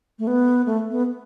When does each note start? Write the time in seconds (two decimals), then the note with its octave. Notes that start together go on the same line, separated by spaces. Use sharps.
0.19 A3
0.27 B3
0.66 A3
0.91 B3